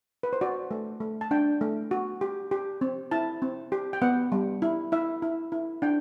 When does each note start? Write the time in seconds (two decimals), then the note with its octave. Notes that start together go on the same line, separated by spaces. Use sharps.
0.23 B4
0.33 C5
0.41 F#4 D5
0.71 A3
1.00 A3
1.21 A5
1.31 D4 G5
1.61 A3
1.91 F#4
2.21 G4
2.51 G4
2.81 C4
3.11 E4 A5
3.42 C4
3.72 G4
3.93 G5
4.02 B3 F#5
4.32 G3
4.62 E4
4.92 E4 E5
5.22 E4
5.52 E4
5.82 D4 G5